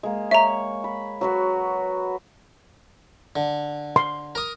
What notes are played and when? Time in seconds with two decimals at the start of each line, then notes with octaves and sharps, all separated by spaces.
0.03 G#3 A#3
0.31 C#5 E5 A#5
0.84 B5
1.21 F#3 F#4 B4
3.36 D3
3.96 C6
4.35 A#4 D#6